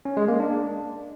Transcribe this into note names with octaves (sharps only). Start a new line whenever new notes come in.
C#4
G#3
A#3
D4